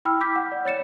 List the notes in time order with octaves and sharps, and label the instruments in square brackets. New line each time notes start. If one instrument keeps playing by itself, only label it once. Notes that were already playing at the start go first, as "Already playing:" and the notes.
[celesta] E4 G5 B5 E6 F6
B5 D6 G6 B6
F#5
D5
C#5 A6 C#7 E7